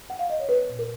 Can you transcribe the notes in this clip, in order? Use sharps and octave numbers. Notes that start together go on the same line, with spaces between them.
F#5
F5
D#5
C#5
B3 B4
A#2
A#4